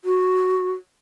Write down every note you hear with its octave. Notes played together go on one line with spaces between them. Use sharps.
F#4